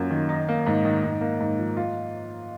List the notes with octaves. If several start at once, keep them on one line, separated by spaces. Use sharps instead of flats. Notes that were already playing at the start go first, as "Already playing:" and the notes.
Already playing: F#2 A#3 F4
D#3
D#4
A#3
G#2
D#3
G#2
A#3
G#2
F3
F4